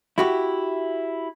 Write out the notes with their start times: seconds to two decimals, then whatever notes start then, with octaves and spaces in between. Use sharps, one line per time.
0.18 E4 F#4 G4